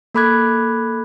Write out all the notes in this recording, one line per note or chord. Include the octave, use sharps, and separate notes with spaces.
A#3 A4 B5 D6 F#6 G#6